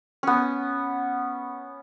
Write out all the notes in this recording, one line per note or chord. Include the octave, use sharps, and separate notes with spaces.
B3 C#4